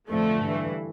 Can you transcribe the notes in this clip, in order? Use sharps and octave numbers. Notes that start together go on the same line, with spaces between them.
F2 D3 F3 A3
G2 E3